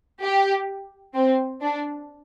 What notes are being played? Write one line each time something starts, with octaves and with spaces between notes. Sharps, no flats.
G4
C4
D4